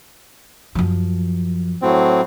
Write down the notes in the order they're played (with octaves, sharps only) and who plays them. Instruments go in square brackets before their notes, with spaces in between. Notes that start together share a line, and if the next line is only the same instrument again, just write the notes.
[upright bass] F#2 F3
[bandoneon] A2 F#3 C4